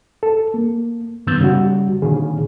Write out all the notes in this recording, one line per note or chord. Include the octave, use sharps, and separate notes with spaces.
A4
A#3
G2 D#3 B3 E6 G6 A6
C#3 G3 F#4
A#2 D3 D#3 G#4